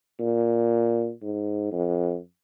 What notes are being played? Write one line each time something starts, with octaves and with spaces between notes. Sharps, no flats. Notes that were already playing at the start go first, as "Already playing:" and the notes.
A#2
G#2
F2